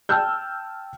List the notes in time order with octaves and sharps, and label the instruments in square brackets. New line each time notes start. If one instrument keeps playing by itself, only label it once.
[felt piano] G5 A5 E6 F6 G6